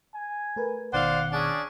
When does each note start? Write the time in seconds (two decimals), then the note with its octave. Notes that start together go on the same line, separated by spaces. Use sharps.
0.14 G#5
0.56 A3 A#4 B4
0.93 G#1 B2 D#3 C5 D5 F5 F#5
1.33 C#4 D4 G#4